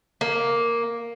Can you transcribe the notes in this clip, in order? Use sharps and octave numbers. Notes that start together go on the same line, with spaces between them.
A#3